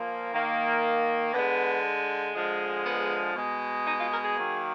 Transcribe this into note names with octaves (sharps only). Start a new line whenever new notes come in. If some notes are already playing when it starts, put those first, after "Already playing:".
Already playing: A#2 F3 A#3
D#3 A#3
D3 G#3 B3
D3 F3 G#3
B3
B2 G#3
D#4
F4
A#4
G#4
D#3 F#3 A#3